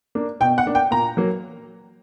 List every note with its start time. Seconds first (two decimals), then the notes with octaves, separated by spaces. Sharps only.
0.15 A#3 D4
0.40 B2 G5
0.58 F#5
0.66 A#3 D4
0.75 G5
0.91 A#2 A#5
1.17 F#3 A#3